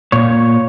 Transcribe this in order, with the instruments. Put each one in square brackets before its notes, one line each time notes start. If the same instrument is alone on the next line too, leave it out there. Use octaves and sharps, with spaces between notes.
[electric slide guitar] A#2 C#5